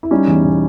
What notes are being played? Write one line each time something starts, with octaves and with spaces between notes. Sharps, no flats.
E4
G3 C#4 D#4
E2
B2